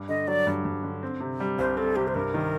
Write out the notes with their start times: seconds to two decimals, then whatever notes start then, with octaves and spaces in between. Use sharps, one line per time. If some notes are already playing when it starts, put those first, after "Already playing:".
Already playing: G2
0.08 D3 D#5
0.27 F#3 D5
0.47 G2
0.65 G2
0.83 D3
1.03 C4
1.20 C3
1.40 G3
1.58 C2 C5
1.77 C4 A4
1.96 C3 G4
2.08 C5
2.15 G2 A#4
2.34 D#3